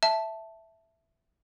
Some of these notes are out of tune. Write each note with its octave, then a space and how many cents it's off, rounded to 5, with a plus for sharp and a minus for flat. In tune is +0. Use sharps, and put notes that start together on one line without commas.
E5 +0 A5 +0